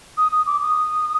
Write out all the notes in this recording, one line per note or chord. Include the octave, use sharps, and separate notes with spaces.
D#6
D#6
D6
D#6